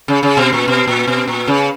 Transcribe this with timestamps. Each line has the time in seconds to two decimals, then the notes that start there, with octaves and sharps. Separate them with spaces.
0.08 C#3
0.23 C#3
0.37 B2
0.53 A#2
0.68 B2
0.87 A#2
1.07 B2
1.27 A#2
1.47 C#3